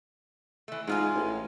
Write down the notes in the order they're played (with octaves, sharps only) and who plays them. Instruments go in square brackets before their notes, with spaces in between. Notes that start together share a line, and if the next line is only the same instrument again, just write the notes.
[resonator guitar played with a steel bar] E3 A3
[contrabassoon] G#2 [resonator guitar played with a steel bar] G#3 F4 G#5
[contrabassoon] A1